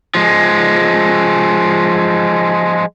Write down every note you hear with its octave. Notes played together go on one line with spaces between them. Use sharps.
F3 G#3